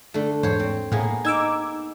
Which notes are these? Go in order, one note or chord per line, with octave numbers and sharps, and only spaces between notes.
D3 A3
E2 G#2 C5 C#5
C4
A2 A#3 B3 G#4
D#4 D6 E6 G#6